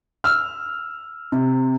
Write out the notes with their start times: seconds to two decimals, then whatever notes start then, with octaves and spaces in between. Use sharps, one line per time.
0.24 E6 F6
1.32 C3